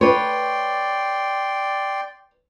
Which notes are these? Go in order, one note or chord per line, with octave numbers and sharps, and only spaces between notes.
B4 C#5 D5 G5 C6